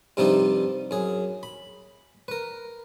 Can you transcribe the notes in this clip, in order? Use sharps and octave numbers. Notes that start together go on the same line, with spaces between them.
G2 C3 F3 G3 C4 D#4
F#2 G#4
B5
A#4 B4